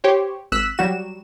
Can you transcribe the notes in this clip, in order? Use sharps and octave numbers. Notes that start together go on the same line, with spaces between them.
G4 C5 C#5
G#1 E6 F#6 B6 E7
F#3 G3 F#4 E7